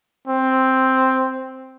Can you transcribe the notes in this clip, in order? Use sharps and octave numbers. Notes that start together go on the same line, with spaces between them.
C4